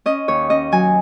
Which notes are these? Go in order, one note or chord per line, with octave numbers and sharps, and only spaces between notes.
C#4 D#5
D#2 C#5
C#4 D#5
F#3 G#5